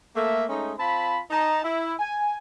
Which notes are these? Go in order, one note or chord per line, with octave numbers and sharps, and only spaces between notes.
A3 A#3 E5
G#3 A3 C#4 D#4
C4 F4 A5 B5
D#4 A5 A#5
E4
G#5